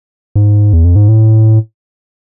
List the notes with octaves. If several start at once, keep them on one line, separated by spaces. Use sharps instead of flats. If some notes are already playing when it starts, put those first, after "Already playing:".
G#2
E2
F2
G#2
A2